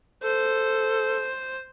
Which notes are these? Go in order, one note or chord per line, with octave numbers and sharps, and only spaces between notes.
A4 C5